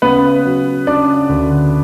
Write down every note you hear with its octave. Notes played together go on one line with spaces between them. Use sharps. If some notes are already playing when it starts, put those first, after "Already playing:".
C#3 B3 B4
F#3
C#3 D4 D5
D2